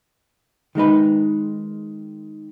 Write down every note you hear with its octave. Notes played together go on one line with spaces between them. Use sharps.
D#3 G#3 D#4 B4